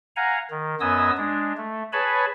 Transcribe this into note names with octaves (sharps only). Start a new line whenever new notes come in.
F5 F#5 G#5 A#5
D#3
F#2 B3 D#5 G#5 D#6 E6
G#3 D4
A3
G#4 B4 C#5 G#5 A5 B5